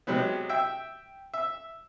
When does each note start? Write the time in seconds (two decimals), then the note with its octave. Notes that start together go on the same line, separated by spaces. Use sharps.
0.07 C3 F#3 G#3 B3
0.49 E5 G5
1.34 E5